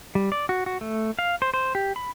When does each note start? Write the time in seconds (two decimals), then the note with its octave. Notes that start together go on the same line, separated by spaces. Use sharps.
0.15 G3
0.32 D5
0.49 F#4
0.66 F#4
0.81 A3
1.19 F5
1.42 C5
1.54 C5
1.75 G4
1.96 B5